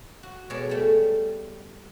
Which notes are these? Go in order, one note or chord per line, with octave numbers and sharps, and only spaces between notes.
F#4
B2 G#3 C#5 D5 A5
G3 A3